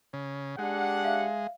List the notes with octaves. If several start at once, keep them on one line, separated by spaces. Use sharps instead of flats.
C#3
G#3 D4 G4 F#5
E5 F5